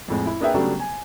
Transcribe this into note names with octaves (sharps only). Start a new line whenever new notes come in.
F2 A2 G#3
E4
A#3 D4 G#4 B4 E5 G5
C#3 F#3 G3 A3 B3 D4
G#5